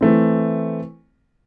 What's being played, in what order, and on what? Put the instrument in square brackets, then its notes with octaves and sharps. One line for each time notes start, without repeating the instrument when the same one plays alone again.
[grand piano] E3 A3 C4